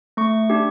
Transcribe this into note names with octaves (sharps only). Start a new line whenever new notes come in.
A3 C#6
D4 G4